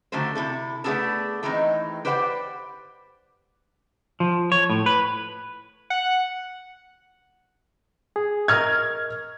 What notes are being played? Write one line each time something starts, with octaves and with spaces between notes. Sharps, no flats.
D3 D#3 F3 A3 F#4 C5
C3 E4 A4
A3 B3 D4 F4 G#4 A4
D#3 E3 G#3 A3 C4 D#4
G4 B4 C5 D5 F5 F#5
F3
C#5
A2
B4
F#5
G#4
A#4 D#5 C#6 F6 G#6